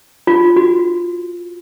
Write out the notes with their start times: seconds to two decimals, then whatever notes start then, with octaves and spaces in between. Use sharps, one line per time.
0.27 F4
0.56 F#4